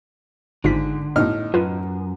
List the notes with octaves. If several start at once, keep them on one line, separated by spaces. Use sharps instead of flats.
G#1 G#2 D3 F4 B6
A2 D#4 F6
F#2 F4 B4